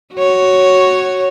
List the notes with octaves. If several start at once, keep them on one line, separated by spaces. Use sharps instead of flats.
F#4 C#5